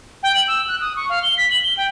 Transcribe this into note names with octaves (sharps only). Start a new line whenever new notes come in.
G5
F#7
E6
F#6
D#6
C#6
F5
G7
B6
F#7
G7
G5